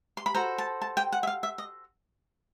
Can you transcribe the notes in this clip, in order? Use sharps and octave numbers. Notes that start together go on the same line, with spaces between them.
C6
B5
F#4 A4 C5 A#5
A5
A5
G5
F#5
E5
F5
E5
D#5